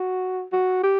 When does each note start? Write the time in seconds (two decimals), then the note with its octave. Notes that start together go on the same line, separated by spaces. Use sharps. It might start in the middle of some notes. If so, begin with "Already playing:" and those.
Already playing: F#4
0.53 F#4
0.83 G4